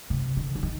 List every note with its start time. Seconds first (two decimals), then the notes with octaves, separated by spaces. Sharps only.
0.10 C3
0.37 D3
0.55 D3
0.63 D#3